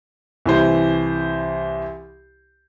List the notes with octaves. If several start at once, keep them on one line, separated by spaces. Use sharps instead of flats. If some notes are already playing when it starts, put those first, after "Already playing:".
C2 E3 C5